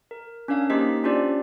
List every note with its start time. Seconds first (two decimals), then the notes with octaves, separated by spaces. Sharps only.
0.11 A#4
0.48 C#4 D4 A#4 F5
0.70 A#3 D#4 G4 C5 D#5 B6
1.04 C#4 D4 F4 G4 C5 D5